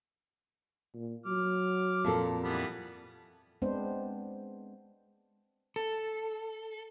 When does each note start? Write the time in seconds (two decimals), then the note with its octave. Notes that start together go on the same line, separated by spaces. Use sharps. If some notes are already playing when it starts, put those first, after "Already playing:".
0.94 A#2
1.26 F#3 D6 F6
2.05 F2 A#2 A4
2.42 E3 G3 B3
3.62 G#3 B3 C4 D4 C5
5.76 A4